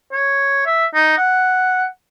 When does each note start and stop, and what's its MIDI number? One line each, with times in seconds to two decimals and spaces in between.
0.12 0.62 73
0.66 0.86 76
0.95 1.16 63
1.18 1.86 78